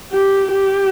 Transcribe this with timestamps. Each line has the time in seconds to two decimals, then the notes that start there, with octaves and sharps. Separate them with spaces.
0.13 G4
0.52 G4